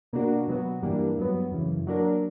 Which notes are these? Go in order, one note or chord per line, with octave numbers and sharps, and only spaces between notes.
B2 A#3 D4 F#4
B2 F#3 B3 F#4
G2 E3 G3 A#3 D4
G2 F#3 B3
F#2 C#3 E3
F#3 A#3 D4 A#4